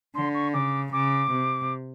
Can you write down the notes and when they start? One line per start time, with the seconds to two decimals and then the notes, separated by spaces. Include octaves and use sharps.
0.15 D3 C6
0.34 C#6
0.54 C#3 D6
0.93 C#3 D6
1.31 C3